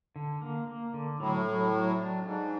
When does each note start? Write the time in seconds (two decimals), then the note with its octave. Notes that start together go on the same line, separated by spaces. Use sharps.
0.16 D3
0.42 A#3
0.68 A#3
0.94 D3
1.19 A2 F#3
1.45 F#3
1.72 F#3
1.98 D4
2.23 G#2 D4